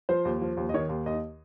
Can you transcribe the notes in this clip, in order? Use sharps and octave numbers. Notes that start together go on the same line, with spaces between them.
F3 C5
D#2
F3
D#2
D#5
D#3 C#5
D#2
D#2 D#5